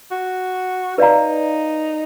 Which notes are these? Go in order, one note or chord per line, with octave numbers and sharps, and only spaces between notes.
F#4
D#4 B4 D5 F5 A#5